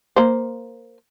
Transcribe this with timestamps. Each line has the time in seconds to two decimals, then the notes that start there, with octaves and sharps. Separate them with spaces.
0.16 A#3 C5